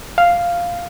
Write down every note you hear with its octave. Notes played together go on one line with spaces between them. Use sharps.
F5